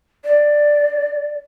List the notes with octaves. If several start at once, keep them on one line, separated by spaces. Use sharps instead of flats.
D5